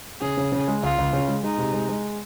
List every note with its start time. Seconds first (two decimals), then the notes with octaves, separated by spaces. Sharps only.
0.21 C#3 G#4
0.37 C#3
0.52 C#3
0.68 G#3
0.83 C#2 F4
0.98 C#2
1.13 C#3
1.28 G#3
1.43 G#3 D#4
1.58 C3
1.73 G#3
1.88 G#3